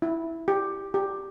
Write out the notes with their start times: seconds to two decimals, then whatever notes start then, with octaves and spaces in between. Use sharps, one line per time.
0.02 E4
0.48 G4
0.94 G4